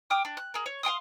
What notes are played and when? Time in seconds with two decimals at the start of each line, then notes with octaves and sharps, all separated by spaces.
0.10 G5 D6 D#6 F6
0.25 D4
0.37 F#6
0.54 G#4 A#4
0.66 C#5
0.83 F5 G5 C6 D#6